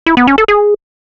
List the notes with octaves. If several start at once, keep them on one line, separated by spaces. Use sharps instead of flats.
E4
B3
C#4
A4
G#4